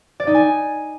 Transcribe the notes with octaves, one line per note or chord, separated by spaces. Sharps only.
D5
D#4
G#5